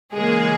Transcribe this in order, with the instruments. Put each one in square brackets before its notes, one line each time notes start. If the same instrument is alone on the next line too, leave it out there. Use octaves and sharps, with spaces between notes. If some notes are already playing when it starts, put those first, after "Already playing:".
[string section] C#3 E3 G#3 A#3 G#4